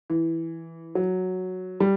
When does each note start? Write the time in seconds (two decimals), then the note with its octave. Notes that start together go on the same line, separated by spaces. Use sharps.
0.10 E3
0.95 F#3
1.80 G3